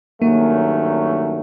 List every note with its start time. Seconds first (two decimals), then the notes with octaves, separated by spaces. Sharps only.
0.21 G2 D#3 F#3 A3 A#3 C#4